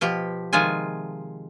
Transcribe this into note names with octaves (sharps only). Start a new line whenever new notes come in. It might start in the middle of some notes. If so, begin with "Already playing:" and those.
B2 F3 G4
C3 D#3 F3 G#3 F4 G#5